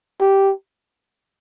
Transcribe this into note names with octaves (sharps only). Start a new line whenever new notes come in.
G4